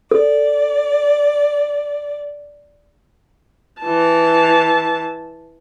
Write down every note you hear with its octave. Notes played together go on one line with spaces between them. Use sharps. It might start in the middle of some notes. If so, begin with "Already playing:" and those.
A4 D5
E3 A5